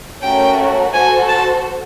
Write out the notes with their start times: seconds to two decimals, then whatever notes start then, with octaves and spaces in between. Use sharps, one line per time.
0.23 A3 C#4 F#4 A#4 G5
0.94 F#4 A4 C5 G#5
1.29 A5